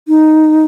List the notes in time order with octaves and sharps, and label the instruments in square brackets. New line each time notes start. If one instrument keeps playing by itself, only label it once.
[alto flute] D#4